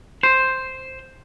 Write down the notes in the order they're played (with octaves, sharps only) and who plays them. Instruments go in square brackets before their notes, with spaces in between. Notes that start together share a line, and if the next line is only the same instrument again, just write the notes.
[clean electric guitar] C5